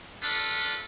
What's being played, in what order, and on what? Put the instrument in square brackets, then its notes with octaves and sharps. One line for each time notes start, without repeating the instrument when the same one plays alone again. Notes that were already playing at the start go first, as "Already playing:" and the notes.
[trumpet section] D4 F4 A4 B4